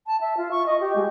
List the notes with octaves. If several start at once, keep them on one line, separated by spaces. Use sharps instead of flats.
A5
E5
F4
C#6
D#5
G4
G#3